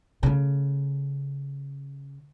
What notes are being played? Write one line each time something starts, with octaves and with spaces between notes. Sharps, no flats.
C#3 A3